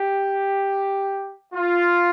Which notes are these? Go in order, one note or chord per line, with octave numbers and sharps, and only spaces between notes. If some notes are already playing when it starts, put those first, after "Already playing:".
Already playing: G4
F4